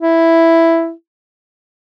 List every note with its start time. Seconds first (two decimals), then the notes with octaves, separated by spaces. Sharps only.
0.02 E4